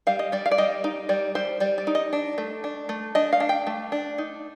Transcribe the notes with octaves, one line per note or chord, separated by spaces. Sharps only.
G3 F5
D#5
G3 D5
F5
D5
G3 D#5
D#4
G3 D5
G3 C5
G3 D5
D5
D#4
D#5
D4
A3
D4
A3
D4 D#5
F5
D4
G5
A3
D4
D#4